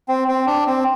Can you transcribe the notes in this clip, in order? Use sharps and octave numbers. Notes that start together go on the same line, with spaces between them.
C4
C4
D4
C4